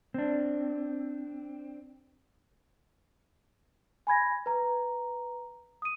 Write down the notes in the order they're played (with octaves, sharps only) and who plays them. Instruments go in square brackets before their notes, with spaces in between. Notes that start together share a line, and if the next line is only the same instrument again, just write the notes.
[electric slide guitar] C4 D4
[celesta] G#5 B5 G#6 A#6
B4 A#5
D#6 D#7